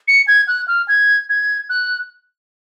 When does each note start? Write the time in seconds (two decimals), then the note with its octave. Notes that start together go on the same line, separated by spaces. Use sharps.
0.08 C#7
0.28 G#6
0.48 F#6
0.68 F6
0.88 G#6
1.29 G#6
1.69 F#6